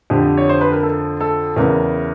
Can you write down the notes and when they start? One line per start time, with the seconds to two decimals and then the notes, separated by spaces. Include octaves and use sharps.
0.10 F2 D3 F3 G4
0.37 C#5
0.49 C5
0.61 B4
0.72 A#4
0.83 A4
1.21 A4
1.56 E2 C#3 E3 A#4